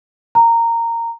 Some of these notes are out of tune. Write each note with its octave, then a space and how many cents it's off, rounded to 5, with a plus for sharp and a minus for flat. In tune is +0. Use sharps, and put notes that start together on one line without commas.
A#5 -15